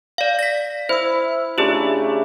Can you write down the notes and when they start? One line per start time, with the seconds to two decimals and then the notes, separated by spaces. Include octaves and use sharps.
0.18 D5 F5
0.39 A#6 B6
0.89 E4 C5 E6
1.58 C#3 A3 D4 F4 G4